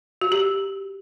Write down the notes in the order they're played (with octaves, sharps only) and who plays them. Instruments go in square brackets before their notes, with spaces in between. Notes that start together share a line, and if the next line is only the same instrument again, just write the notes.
[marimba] F#4
G4